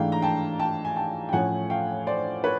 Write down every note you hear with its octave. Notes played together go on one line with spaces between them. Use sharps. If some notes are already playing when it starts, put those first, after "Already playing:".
Already playing: G#2 E3 A3 D4 F5 G5
A#5
G5 A5
G5 A5
G#5
G5 A5
G5
A2 F3 A3 C#4 F#5 G#5
F5 G5
C5 D5
B4 C#5